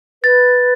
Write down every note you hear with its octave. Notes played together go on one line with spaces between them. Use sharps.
B4 A6